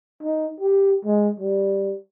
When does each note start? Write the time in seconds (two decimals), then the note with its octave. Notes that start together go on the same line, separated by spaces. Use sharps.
0.23 D#4
0.60 G4
1.05 G#3
1.40 G3